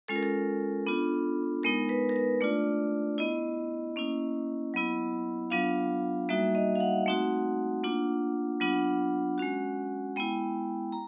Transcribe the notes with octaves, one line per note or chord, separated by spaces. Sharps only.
G#3 C#4 F4 A4
A#4
A4
B3 D4 F4
G#3 B3 D#4 A#4
B4
A#4
B4
A3 D4 F4 D5
B3 E4 D#5
A#3 C#4 E4
F#3 B3 E4
F#3 B3 D4 F4 F5
G3 A#3 D#4 F#4 E5
D#5
F5
F#5
A3 C4 D#4 F#4
A#3 D4 F4
F#3 B3 D4 F4 F#5
G#3 C#4 F#4
G#3 B3 E4 G5
A#5